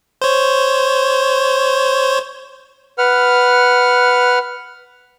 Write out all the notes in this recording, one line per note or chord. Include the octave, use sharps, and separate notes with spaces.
C5 C#5
B4 F#5 F6